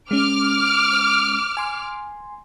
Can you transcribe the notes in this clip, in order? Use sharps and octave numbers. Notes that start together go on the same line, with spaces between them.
G#3 C#4 D6 F6
G#5 C6